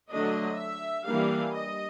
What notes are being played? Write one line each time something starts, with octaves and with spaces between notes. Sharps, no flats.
D3 F#3 A3 D4 D#5
E5
E3 G3 A#3 D4 F5
D#5